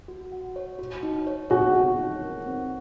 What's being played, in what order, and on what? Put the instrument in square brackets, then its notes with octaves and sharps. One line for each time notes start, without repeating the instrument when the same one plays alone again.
[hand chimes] F#4
F#5
C#5
F#4
D#4
C#5
[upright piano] F#4 [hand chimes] C#5
[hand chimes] C#5
D#4
A#4
C4